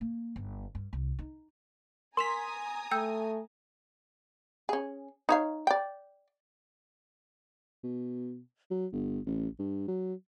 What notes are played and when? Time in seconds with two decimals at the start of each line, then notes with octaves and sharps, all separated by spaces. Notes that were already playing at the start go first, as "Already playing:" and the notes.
0.01 A#3
0.36 G1
0.75 G2
0.93 C2
1.19 D#4
2.17 A#4 G#5 A#5 C6 D#6 B6 E7 F7
2.91 A3 G5 E6 G6
4.69 C#4 G#4
5.29 D#4 C#5 F5
5.67 D5 G5
7.83 B2
8.71 F#3
8.93 G1
9.26 A1
9.59 G2
9.88 F#3